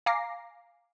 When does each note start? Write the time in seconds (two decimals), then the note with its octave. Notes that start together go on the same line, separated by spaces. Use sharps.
0.06 F5 G#5 A#5 D6 A#6 C7